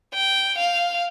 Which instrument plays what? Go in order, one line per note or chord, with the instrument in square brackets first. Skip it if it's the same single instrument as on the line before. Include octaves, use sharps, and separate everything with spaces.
[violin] G5
F5